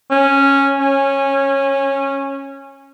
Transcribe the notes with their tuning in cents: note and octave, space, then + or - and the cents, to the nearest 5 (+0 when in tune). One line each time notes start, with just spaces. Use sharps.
C#4 -5
C#4 -15